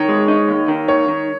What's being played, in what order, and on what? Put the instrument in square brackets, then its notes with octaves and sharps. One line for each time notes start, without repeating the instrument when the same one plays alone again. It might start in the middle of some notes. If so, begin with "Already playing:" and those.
Already playing: [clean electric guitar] D#3 [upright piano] C#5
[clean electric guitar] G#3
D#4
D#2
D#3
[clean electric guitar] D#2 [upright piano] C#5
[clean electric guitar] D#3